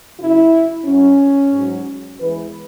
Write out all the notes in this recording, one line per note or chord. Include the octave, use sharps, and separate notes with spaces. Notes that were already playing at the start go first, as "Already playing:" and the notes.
F#2 C#3 F#3 E4
F#2 F#3 C#4
G#2 F#3
E2 E3 G#3 B4